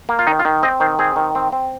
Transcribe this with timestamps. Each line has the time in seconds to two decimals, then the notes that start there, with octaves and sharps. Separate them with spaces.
0.09 A#3
0.19 F4
0.27 D#3 D#4
0.39 F4
0.45 D#3
0.63 C4 D#5
0.80 D#3 C5
0.99 C4 G#4
1.16 D#3
1.35 C4
1.52 C4